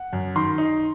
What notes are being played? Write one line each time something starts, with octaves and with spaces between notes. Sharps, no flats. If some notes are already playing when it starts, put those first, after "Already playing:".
Already playing: F#5
F#2
D#3 C6
D#4